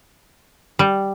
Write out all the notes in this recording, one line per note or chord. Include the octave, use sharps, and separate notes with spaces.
G3